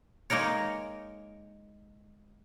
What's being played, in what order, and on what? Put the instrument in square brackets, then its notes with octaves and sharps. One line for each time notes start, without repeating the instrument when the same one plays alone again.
[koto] G#3 A#3 D#4 A#4 C#5